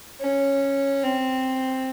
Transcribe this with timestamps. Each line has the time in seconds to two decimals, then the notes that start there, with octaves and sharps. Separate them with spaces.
0.21 C#4
1.03 C4